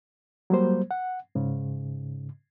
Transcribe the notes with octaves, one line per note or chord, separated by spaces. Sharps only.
F#3 G3 A#3 C5
F#5
G#2 C#3